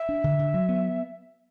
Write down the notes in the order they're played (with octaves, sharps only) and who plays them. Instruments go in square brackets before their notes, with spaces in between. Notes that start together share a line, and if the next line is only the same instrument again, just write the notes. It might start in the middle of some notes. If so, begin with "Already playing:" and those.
Already playing: [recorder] E5
[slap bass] D4
D3
D3
F#3
B3